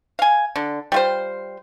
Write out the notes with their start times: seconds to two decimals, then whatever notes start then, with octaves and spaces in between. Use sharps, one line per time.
0.19 F5 G#5
0.56 D3
0.92 G3 F4 C5